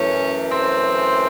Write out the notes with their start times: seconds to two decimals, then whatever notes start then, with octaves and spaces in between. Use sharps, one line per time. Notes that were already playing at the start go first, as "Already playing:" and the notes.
Already playing: F#2 E3 A3 C#4
0.51 C4